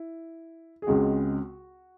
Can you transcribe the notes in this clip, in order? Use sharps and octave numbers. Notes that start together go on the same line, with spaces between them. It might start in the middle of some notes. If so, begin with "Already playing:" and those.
Already playing: E4
G#4
C#2 C#3 G#3 C4 F#4